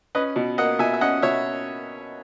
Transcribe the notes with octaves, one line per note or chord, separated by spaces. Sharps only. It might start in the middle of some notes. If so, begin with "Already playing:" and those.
C#4 B4 D#5
B2
A#3 D#5 F#5
B2 E5 G#5
E5
C#4 D#5 F#5
B2 C#5 E5